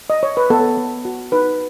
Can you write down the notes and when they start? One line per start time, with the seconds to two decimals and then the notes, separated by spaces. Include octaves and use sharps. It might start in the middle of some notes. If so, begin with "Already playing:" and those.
0.10 D#5
0.23 C#5
0.37 B4
0.50 B3 A4
0.77 B3
1.05 F#4
1.32 D#4 B4